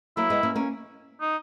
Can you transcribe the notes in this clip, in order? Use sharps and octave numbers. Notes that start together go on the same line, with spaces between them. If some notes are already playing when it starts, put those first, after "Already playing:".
F#3 A#3 E4
G#3 B3
A#3 C#4
A#3 C#4
D#4